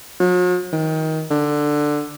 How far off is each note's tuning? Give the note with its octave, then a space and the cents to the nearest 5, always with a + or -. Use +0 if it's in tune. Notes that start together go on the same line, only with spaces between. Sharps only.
F#3 -45
D#3 +25
D3 +10